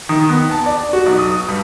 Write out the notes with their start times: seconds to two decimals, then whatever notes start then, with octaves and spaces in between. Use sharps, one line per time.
0.09 D#3
0.29 B3
0.51 A5
0.66 D5
0.93 F#4
1.06 B1
1.19 D#6
1.49 G2